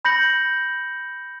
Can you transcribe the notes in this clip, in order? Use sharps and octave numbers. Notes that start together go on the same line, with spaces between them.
B5 G6 A#6 C#7 F#7